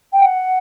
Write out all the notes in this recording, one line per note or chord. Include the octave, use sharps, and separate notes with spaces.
G5
F#5